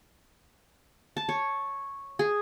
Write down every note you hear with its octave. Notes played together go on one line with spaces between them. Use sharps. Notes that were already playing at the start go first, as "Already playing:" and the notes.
A5
C#5
G#4